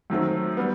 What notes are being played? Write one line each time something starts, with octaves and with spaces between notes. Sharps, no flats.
F#2 D#3 F#3 A3 C4
G3 B3